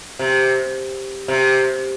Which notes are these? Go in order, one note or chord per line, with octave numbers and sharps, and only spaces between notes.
C3
C3